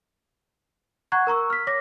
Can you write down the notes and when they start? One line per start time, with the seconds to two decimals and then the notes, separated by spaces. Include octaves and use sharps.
1.12 F#5 A#5 C#6 F#6 G#6
1.27 A#4 A#5 C#6 E6
1.50 F6 B6
1.67 C#5 D6 A#6